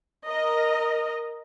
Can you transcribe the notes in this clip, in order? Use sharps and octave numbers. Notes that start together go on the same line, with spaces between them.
A#4 D#5